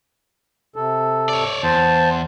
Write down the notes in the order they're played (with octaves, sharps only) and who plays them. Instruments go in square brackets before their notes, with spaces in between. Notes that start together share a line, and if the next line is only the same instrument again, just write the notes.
[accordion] C3 A4
[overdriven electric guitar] C#5 D5
[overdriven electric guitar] E2 [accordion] C5 A5